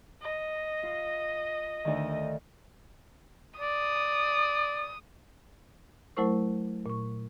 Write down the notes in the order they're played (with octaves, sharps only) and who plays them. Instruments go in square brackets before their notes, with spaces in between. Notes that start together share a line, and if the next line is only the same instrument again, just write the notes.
[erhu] D#5
[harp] F4
D2 D3 D#3
[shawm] D5 [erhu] D#6
[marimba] F#3 A3 E4 A#4 C5 C#6
A#2 C#6